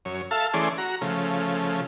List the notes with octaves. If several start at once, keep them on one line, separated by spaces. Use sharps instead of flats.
F#2 C#5
A4 E5 F5 A5
E3 A3 C#4 G#4 D5 C6
F#4 A#5
C#3 F3 A3